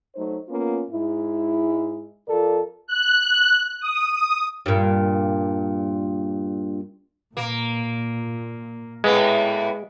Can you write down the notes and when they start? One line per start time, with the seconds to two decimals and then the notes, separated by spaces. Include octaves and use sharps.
0.15 F#3 A3 D#4 C5
0.49 A#3 B3 C#4 F4
0.90 G#2 G#3 E4
2.27 F2 F4 A4 A#4 D5
2.87 F#6
3.80 D#6
4.66 G2 A#2
7.37 A#2 A#3
9.04 A2 G#3 A#3 B3